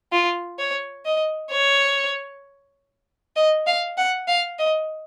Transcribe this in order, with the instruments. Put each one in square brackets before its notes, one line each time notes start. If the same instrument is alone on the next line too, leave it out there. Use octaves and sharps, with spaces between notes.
[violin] F4
C#5
D#5
C#5
D#5
F5
F#5
F5
D#5